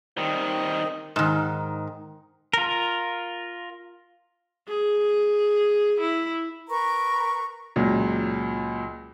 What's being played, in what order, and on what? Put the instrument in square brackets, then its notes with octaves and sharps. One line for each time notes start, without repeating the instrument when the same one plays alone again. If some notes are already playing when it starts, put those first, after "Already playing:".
[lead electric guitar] D#3 G3 [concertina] C4 D#5
[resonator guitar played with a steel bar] G#2 D#3
[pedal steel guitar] F4 A#4
[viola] G#4
E4
[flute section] A#4 B4 A#5 C#6
[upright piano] C#2 A#2 F#3